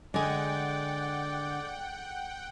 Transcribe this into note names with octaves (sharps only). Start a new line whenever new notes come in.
D3 G#3 G#4 D5 F#5 G5